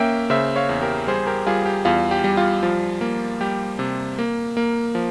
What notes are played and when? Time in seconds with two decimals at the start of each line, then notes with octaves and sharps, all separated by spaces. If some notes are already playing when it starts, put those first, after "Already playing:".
Already playing: A#3 C#4 E5 G5
0.30 C#3 C5 E5
0.56 C#5 F5
0.69 E2
0.81 G4 A#4
1.07 G3 G#4 C5
1.27 G4 A#4
1.47 G3 F4 G#4
1.66 G4
1.85 E2 F4
2.11 G4
2.24 G3
2.37 F4
2.63 F3 F4
3.01 A#3
3.41 G3 G4
3.79 C3
4.18 A#3
4.57 A#3
4.95 F3